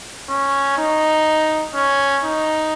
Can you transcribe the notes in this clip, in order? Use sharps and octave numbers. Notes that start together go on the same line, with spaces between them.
C#4
D#4
C#4
D#4